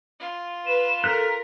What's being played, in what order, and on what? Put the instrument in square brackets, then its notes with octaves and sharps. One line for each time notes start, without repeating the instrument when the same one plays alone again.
[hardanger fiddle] F4
[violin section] B4 [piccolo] E7
[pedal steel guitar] A4 F6 F#6 [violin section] A#4 [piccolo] B6